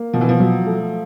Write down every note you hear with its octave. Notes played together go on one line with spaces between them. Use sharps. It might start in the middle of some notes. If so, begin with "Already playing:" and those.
Already playing: A#3
B2 F3
E3
F3
F#3
A3